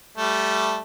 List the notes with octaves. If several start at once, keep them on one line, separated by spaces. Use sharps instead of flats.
G3 A3